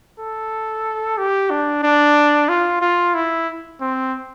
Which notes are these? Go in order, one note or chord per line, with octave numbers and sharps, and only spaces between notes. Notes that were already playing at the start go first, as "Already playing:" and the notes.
A4
G4
D4
D4
F4
F4
E4
C4